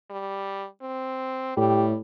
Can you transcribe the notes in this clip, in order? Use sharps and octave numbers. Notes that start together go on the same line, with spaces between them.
G3
C4
A2 G3 G4